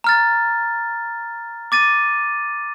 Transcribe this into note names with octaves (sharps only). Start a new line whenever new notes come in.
A#5 F6 A6
D6 A6 D#7